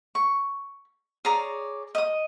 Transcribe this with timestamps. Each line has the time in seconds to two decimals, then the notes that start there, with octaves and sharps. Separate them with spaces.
0.15 C#6
1.25 G#4 C#5 D5 A#5
1.95 D#5 D#6